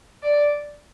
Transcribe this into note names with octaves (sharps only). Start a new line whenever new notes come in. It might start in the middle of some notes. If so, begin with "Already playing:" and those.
D5